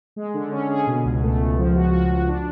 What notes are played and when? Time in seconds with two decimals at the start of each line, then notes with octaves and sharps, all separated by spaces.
0.16 G#3
0.34 D3
0.51 C#4
0.69 G#4
0.87 B2
1.04 C#2
1.23 A3
1.40 C#2
1.58 F3
1.75 F#4
1.93 F#4
2.11 F#4
2.28 D4